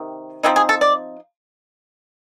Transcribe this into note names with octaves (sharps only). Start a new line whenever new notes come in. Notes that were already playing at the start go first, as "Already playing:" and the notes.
Already playing: C3 D#3
F3 A3 C4 D#4 E4
G#4
A4
D5